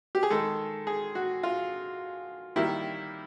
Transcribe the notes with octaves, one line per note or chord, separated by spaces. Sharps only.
G4
G#4
D#3 G#3 A4
G#4
F#4
F4
D#3 G3 A#3 E4